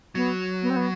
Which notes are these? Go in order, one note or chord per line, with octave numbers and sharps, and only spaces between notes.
F#3 B3
B3
C4
B3